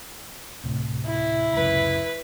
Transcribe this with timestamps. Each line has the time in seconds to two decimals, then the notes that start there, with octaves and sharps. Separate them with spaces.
0.63 D1 C2 A2 C3
1.07 E4
1.54 C#2 F#2 B4